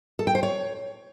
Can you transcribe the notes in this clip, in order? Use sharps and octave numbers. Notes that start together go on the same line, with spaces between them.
A4
G5
C5
C#5